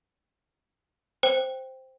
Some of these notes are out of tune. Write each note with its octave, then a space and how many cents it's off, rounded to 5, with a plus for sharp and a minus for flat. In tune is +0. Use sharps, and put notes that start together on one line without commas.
C5 +0 G5 +0